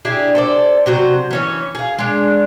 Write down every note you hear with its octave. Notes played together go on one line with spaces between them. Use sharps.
D4 E4 G4 G#4
A4 C5 D5
C3 F#3 C5
E3 C#4 C#5
G#4 F5
G#3 D4